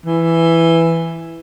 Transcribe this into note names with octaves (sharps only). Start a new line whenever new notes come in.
E3